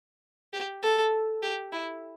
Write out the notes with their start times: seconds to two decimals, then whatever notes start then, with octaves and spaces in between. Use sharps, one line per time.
0.53 G4
0.83 A4
1.43 G4
1.72 E4